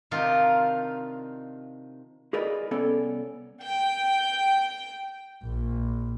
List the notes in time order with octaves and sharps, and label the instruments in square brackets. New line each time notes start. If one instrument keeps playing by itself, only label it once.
[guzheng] C3 D#3 D4 D#4 F4 A#4
[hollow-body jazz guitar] E4 G#4 A#4 B4 D5 D#5
C2 B3 C#4 A4 C#5 D5
[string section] G5
A#1